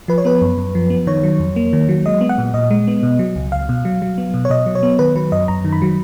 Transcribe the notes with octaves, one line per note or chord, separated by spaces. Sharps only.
F3 B4
C#5
B3 B4
F#2
F#2
F3
B3
D#3 C#5
F#3
F2
A#3
D#3
F#3
G#3 D#5
B3
F#5
A#2
A#2 D#5
G#3
B3
B2
F#3
C#2
C#2 F5
B2
F#3
F#3
B3
B2
C#5
B2 D#5
F#3
C#5
B3
D#3 B4
F#3 B4
F#2 D#5
F#2 A#5
D#3
B5
F#3